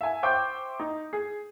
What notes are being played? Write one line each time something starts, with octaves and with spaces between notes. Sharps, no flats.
E5 G#5
C5 E5 G5 C#6 D6 G6
D#4
G#4